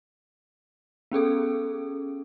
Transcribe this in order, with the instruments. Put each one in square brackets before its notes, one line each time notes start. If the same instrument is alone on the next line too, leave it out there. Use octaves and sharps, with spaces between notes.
[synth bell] B3 C#4 G#4 A4